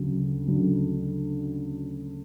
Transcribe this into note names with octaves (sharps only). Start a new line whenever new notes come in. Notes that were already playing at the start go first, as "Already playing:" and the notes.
Already playing: D2 C#3 F#3
D2 C#3 F#3